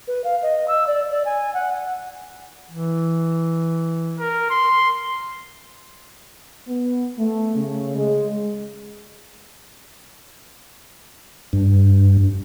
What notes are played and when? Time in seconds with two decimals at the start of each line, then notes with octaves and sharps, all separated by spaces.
0.07 B4
0.24 F5
0.42 D#5
0.68 E6
0.87 D5
1.10 D5
1.26 G#5
1.54 F#5
2.71 E3
4.19 A#4
4.50 C6
6.68 B3
7.19 A3
7.55 C#3
7.96 G#3
11.53 G2